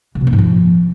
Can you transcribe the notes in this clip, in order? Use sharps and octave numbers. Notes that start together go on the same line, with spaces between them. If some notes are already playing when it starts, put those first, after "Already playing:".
C#3
B2
A#3
G#2
F3